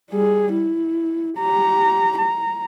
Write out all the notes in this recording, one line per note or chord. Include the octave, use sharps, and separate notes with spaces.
G3 G#4
E4
G4 A#5
A#5